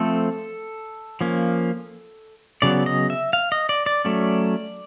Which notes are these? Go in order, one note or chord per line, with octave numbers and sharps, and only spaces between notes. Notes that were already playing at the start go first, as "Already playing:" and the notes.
Already playing: F3 A3 C4 A4
F3 A#3 C#4
C#3 F#3 B3 D5
D#5
E5
F5
D#5
D5
D5
F#3 A3 C#4 D5